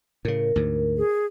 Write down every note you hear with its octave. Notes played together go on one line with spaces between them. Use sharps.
A2 C#3 A#4
D2 G#2
G#4